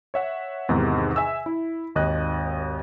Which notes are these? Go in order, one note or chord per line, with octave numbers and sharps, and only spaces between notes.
C#5 E5 F#5
E2 G#2 C3 D#3
E5 G#5 E6
E4
G#1 D#2 D#5 F#6